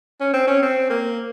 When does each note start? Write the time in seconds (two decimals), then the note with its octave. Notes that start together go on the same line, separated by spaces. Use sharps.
0.21 C#4
0.33 C4
0.47 C#4
0.62 C4
0.90 A#3